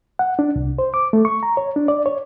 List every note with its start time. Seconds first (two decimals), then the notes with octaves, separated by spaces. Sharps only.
0.19 F#5
0.39 D4
0.56 C2
0.79 C5
0.94 D6
1.13 A3
1.25 C#6
1.43 A#5
1.57 C#5
1.76 D4
1.88 D5
2.06 C#5